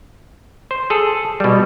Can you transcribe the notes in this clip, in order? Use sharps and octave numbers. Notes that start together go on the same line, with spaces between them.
C5
G#4 A4
B2 G3